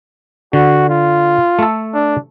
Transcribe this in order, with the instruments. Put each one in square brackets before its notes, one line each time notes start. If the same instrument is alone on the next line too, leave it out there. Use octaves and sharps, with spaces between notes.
[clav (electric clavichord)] D3 [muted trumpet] F#4
[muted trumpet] F4
[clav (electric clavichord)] A3 A4
[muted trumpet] D4